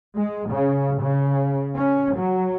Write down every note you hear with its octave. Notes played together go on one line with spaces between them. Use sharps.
G#3
C#3
C#3
C#4
F#3